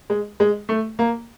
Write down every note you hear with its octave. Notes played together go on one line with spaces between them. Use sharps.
G#3
G#3
A3
A#3